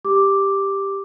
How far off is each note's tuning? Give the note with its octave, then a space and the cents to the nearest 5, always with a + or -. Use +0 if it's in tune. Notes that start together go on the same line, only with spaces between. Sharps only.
G4 +5 D6 +0